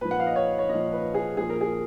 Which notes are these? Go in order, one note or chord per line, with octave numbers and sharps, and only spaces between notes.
A#2 F3 B4
F#5
F5
D#5
C#5
C#5
A#2 D#5
F3
B4
G#4
A#2 F3 G#4
A#4
G#4